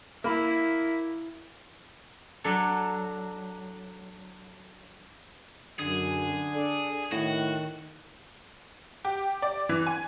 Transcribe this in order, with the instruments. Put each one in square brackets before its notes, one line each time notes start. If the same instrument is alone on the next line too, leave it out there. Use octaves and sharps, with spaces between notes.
[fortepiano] A#3 B5 [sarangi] E4
[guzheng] F#3 D4 A4
[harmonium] F#2 [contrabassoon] D3 [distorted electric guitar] G#4
[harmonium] D4 A4 D5
[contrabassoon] A2 [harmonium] D#3 [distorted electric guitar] F#4
[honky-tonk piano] G4
D5
E3
G#5